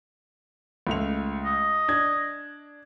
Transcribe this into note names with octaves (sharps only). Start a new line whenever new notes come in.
C#2 A3 F7
D#5
D4 G#6